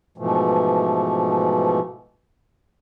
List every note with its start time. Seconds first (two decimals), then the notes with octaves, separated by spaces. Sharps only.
0.18 G#2 B2 E3 F3 A3